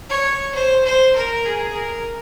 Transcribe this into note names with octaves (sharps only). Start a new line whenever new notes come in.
C#5
C5
C5
A#4
G#4
A#4